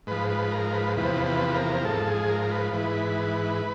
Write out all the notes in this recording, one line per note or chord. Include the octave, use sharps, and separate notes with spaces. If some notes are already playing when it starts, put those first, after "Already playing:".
G#2 F3 B4
B4
A#4
B4
E2 C3 F3 B4
B4
A#4
G#2 F3 A4
G#4
A#4
A#4
B4
G#2 E3 B4